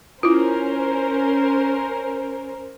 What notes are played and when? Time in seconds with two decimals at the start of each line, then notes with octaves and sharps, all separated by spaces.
0.23 C#4 E4 F4 A#4 C5